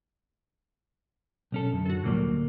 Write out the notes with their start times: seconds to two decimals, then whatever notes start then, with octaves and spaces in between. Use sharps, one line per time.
1.52 B1 C#4 A4
1.72 F#2 D3
1.86 F#4 A4
2.04 D2 A#2 F#3 G3 A#3